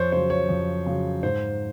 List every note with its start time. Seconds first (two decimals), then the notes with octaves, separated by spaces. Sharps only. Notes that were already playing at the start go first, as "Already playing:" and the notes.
Already playing: F2 C5 C#5
0.12 C#3 F#3 C5
0.30 C#5
0.49 F2
0.86 C#3 F#3
1.23 G#2 C5